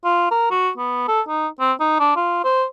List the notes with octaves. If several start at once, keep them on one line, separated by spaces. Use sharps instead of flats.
F4
A#4
F#4
B3
A4
D#4
C4
D#4
D4
F4
C5